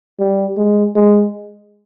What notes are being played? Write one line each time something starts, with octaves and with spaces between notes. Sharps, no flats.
G3
G#3
G#3